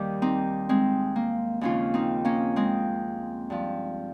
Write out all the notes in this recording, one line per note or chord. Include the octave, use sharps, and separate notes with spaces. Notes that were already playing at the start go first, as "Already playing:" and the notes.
Already playing: D#2 D#3 G3 G4
C4 D#4
G#3 C4
A#3
D#2 C#3 F3 C#4 F4
C4 D#4
A#3 C#4
G#3 C4
G2 F3